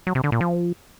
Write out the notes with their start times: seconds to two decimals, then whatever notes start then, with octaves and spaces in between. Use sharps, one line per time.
0.07 F#3
0.15 C3
0.24 D3
0.32 A#2
0.41 F3